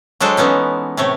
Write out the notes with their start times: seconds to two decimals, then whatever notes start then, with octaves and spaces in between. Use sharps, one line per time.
0.20 F#3 G#3 D4 A4 C5
0.37 E3 B3 C#4 D#4
0.97 A2 C3 A3 C#5